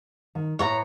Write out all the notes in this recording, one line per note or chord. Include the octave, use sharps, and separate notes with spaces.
D#3
A2 B4 C#5 E5 A#5